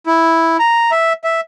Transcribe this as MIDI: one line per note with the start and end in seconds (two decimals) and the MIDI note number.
0.06 0.57 64
0.60 0.91 82
0.91 1.13 76
1.24 1.41 76